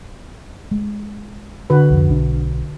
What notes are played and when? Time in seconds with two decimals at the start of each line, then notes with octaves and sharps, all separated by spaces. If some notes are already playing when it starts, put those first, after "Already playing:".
0.71 G#3
1.70 D3 F#4 B4
1.90 C2 F2
2.09 B1 D4